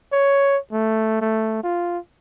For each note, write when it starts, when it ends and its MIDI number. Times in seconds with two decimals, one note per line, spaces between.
0.12 0.58 73
0.73 1.19 57
1.22 1.62 57
1.64 1.98 65